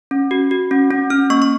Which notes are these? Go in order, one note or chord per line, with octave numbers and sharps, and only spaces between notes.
C#4
F#4
F#4
C#4
C#4
C#4 F6
A#3 C#6
C#6